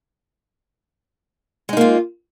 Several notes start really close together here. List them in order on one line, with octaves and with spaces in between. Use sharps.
G#3 D#4 A#3 F4